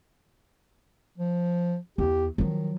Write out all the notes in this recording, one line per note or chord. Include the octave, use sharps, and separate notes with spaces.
F3
E2 G4
D#3 F3 F#3